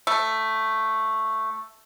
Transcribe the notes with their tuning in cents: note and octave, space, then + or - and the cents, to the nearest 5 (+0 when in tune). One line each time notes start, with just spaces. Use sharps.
A3 +5